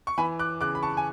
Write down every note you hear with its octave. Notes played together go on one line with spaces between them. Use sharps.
C#6
E3 G#5 B5
D6 F#6
C#3 D6 F#6
B5
A5 C#6
G#5